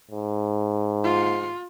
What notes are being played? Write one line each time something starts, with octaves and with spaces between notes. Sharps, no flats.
G#2
F4